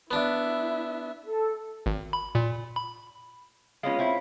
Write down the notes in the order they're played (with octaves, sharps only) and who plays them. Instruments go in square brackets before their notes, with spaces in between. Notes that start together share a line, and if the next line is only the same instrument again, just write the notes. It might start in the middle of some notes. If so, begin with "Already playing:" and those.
[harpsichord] B3 D4 [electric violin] E4 E5
[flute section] A4
[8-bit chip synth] G#1
B5
A#2
B5
[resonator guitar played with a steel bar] G#3 B3 C#4 [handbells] F4 C#5 F5
[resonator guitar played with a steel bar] C4 E4